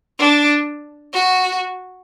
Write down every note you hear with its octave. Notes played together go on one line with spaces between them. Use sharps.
D4
F#4